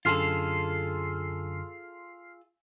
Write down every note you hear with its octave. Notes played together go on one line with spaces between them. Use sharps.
F#2 D3 F4 G#4 A4 C6 F6 C7